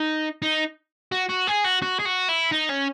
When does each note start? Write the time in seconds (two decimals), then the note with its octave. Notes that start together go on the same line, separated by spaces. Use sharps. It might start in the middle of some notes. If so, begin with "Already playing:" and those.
Already playing: D#4
0.42 D#4
1.12 F#4
1.29 F#4
1.47 G#4
1.64 F#4
1.82 F#4
1.99 G#4
2.06 F#4
2.29 E4
2.52 D#4
2.70 C#4